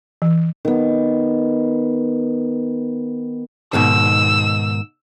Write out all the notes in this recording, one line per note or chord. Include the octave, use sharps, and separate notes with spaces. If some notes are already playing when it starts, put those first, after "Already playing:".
E3
D#3 B3
G#2 B2 D#3 E6